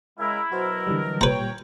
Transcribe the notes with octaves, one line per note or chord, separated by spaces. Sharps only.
C#3 G#3 E4 A#4
B2 F#3 F#4 A#4 C5
D3 E3 G3
A#2 G3 B4 C#5 G5 A#5